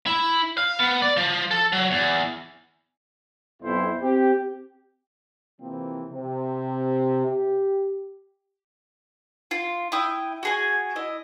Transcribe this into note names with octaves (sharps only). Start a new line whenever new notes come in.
E4
F5
B3
D5
F3
A4
F#3
E2
B1 F2 B2 E4 C5
C4 G4
C3 E3 F3 A#3 C4
C3
G4
F4
E4 G5 D#6
F#4 G#4 G#5
E4 D#5